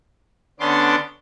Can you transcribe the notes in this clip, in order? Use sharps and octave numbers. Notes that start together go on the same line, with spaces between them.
D3 B3 C#4 D4 C6 D6